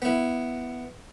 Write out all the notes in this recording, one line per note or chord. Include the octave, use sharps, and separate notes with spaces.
B3 E4